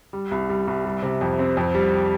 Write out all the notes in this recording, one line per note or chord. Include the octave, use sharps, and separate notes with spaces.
G3
C2
G3
C2
G3
C3
F2
C4
F2
G3